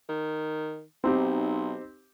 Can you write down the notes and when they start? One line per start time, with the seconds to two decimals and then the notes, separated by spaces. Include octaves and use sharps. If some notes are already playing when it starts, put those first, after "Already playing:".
0.09 D#3
1.04 B1 C4 D#4 G4